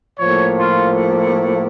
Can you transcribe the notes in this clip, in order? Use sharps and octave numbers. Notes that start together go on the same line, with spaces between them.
A2 F3 A#3 C#5
F4